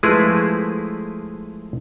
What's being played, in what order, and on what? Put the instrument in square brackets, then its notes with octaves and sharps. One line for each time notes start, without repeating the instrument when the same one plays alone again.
[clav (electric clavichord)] F3 G#3 A3 E4 G#4 B4